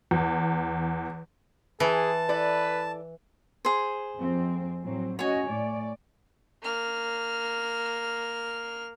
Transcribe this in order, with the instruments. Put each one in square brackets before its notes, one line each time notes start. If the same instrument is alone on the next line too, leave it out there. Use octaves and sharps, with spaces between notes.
[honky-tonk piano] E2
[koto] E3 [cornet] G#4 [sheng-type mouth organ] A5
[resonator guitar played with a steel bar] E4 A4 D5 [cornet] B4
[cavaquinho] G#4 C5
[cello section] F2 C4
A2 F#3 C4
[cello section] C#4 F#4 D#5 [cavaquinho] C#5 G#5
[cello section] A2 A3 D5
[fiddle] A#3 F6